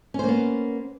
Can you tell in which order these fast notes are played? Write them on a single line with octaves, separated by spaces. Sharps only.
C#4 C5 A#3 B3